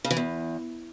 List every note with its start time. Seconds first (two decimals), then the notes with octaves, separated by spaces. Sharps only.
0.04 C#3
0.11 E3
0.17 E2